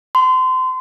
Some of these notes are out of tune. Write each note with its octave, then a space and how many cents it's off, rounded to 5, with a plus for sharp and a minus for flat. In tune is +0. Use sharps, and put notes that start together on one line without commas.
C6 -30